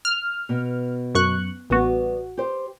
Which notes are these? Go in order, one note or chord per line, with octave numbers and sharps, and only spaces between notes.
F6
B2
F#2 C#6 F#6
A1 G3 B3 F#4
G4 C5